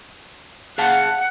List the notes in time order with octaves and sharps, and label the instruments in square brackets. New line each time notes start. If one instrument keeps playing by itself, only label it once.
[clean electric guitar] G#4 F5 A5 [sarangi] F#5